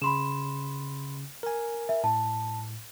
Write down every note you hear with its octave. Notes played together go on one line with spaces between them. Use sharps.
C#3 B5 C6 E7
A#4 G#5
E5
A2 A5